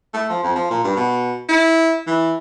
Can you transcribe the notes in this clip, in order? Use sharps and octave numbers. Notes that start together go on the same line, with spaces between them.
A3
F3
F2
F3
A#2
G2
B2
E4
E3